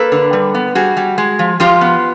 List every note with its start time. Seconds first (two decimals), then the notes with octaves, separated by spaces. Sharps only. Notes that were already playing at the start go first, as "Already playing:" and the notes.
Already playing: A#3 A4 B4
0.12 D3
0.33 G3
0.54 B3
0.75 G3 F#4 G#4
0.97 G3
1.18 G#3
1.39 F3
1.60 F3 F4 G4
1.81 B3